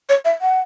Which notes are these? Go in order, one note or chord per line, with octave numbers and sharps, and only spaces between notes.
C#5
E5
F#5